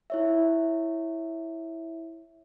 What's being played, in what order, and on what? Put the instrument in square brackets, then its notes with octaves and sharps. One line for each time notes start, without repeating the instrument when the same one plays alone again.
[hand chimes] E4 C#5 E5